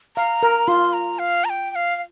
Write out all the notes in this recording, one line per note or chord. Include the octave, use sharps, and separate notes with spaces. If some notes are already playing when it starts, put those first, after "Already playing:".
F5 A#5
A#4
F4 C6
A#5
F5
A#5
G5
G5
F5
F5